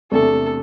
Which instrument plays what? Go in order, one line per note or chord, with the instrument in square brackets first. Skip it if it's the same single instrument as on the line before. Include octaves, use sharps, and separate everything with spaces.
[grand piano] E2 C3 A3 D4 [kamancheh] A4